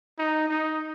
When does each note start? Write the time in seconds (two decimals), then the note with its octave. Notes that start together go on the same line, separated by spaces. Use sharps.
0.19 D#4
0.49 D#4